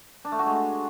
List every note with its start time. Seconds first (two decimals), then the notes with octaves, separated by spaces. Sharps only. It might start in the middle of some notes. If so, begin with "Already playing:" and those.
0.25 D4
0.32 A3
0.39 F#4
0.46 G#3